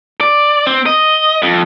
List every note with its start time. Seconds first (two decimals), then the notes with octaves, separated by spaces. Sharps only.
0.21 D5
0.67 C4
0.86 D#5
1.42 F2